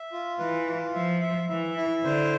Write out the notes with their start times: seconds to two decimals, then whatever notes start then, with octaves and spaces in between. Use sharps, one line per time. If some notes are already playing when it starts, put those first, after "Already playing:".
Already playing: E5
0.12 F4
0.39 E3 B4
0.67 F4
0.94 F3 E5
1.22 E5
1.49 E3 E5
1.76 E4
2.04 D3 C5